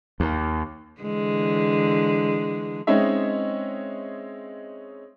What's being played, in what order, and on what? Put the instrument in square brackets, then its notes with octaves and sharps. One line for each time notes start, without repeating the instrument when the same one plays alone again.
[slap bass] D#2
[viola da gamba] D3 E3 G#3
[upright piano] G#3 C4 C#4 D#4 C#5 E5